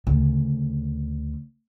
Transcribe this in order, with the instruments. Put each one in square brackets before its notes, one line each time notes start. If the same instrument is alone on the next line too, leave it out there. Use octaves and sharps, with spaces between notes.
[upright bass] D2 C#3